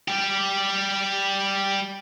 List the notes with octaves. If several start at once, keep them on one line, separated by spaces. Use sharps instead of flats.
G3 G4